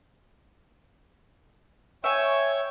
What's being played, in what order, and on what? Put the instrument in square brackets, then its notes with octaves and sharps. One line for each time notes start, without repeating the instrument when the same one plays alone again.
[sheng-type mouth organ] C#5 G5 C#6 [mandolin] E5 G#5